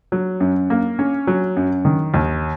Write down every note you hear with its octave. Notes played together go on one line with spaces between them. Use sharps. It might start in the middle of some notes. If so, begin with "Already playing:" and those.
F#3
F#2
A#3
C#4
F#3
F#2
D#3
D#2